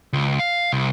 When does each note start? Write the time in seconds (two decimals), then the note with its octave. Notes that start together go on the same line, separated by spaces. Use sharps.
0.13 C#2
0.39 F5
0.73 C2